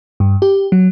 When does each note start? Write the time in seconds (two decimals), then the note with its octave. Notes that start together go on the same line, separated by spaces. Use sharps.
0.20 G2
0.42 G4
0.72 F#3